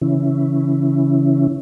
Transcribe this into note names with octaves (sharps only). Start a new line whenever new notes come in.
C#3 E3 C#4 E4